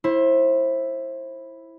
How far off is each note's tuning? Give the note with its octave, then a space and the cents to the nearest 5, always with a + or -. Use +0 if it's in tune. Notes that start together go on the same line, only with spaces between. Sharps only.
E4 +0 C5 +30